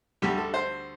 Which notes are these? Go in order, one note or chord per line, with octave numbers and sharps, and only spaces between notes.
D2 D3 G3 G4
A4
C5